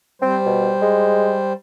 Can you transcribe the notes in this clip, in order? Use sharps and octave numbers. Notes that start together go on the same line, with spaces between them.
G3 C4 C5
B2
G#3